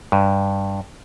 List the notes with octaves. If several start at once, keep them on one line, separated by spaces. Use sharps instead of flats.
G2